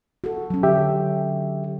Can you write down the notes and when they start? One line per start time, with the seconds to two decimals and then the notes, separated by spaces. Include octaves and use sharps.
0.24 F#4 A4
0.50 F#3 C#4
0.63 D3 G4 E5